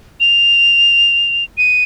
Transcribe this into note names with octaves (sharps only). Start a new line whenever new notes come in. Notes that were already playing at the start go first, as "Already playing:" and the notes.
F7
D#7